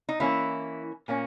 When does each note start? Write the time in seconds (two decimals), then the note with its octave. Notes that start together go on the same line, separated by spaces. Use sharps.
0.09 D#4
0.20 E3 A#3 C#4 E4
1.08 A#2 A#3 C#4